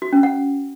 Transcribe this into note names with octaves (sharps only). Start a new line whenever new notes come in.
F#4
C#4
F#5